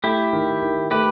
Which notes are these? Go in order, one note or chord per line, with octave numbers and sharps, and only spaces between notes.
A3 E4 G4
D#3
D#3
A3 G4 B4